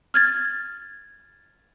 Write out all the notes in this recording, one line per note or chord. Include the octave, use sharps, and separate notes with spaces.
F6 G#6 A6